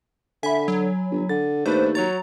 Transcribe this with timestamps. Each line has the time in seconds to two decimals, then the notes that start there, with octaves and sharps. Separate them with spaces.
0.43 D3 E5 G#5 B5
0.68 F#3
1.11 G1
1.29 D3 A6
1.66 D#2 A3 D4 B4 C5
1.95 F#3 C#5 A#5 A6